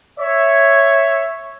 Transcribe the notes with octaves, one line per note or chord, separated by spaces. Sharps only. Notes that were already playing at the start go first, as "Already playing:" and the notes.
C#5 E5